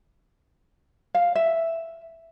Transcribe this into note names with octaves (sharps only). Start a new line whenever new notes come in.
F5
E5